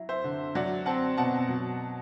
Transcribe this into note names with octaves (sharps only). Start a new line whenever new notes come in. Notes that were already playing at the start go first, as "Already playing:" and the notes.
Already playing: F#3 E4
C5 E5
D3
F#3 D5 F#5
C4 F#5 A5
B2 F#5 A5
F#3